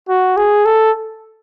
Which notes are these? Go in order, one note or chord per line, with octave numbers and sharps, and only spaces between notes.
F#4
G#4
A4